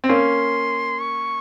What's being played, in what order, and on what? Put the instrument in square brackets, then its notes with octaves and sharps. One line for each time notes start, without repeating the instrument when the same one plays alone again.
[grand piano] C4
[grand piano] A#3 C#4 [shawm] C6
[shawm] C#6